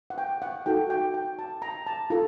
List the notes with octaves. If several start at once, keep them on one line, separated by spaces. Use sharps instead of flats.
F#5
G5
F#5
D#4 F#4 A4 G5
G5
G5
A5
A#5
A5
F4 A4 A#5